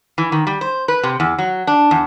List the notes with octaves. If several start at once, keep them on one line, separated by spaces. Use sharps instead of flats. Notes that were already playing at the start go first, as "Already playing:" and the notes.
E3
D#3
G3
C5
B4
C3
E2
F#3
D4
E2